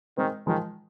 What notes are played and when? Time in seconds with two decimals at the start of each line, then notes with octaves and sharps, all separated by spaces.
0.18 D#3 G#3 C4
0.47 D#3 F3 G#3